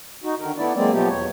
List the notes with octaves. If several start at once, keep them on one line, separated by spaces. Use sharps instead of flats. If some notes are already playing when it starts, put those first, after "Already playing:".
D#4 F#4
D3 D#3 A#4
A3 B3 E4 D5
F#3 G#3 A#3 C4 D5
B2 F3 F#3 A3 B3 G4
E2 C#5